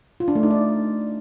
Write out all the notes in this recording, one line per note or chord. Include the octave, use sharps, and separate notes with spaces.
F4
D4
A3
D#4
D5